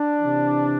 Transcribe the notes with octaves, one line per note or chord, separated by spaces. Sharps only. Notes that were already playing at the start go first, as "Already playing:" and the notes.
Already playing: D4
C3 E3